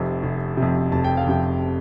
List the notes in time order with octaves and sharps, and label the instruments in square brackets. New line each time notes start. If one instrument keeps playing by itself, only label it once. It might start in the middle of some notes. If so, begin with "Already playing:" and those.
Already playing: [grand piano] F1 F2 C3
F1
C3
F2
F1 A5
G5
F5
F2 C3 G5